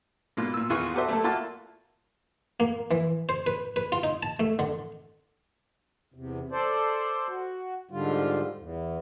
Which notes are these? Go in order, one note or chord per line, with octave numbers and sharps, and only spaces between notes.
G#2 B2 A#3 F4
A#2 E6
E2 D#3 F4 G#4 B4 C#6
F#4 G4 A4 B4 C5 E5
A3 A#3 A4
A#3 F4 F#4 A#4 E5 A5
A#3
E3
C5
B4
B4
F4
D#4
A5
A3
D3
E2 C3
A4 C5 D5
F#4
G#2 D3 G3 F4
E2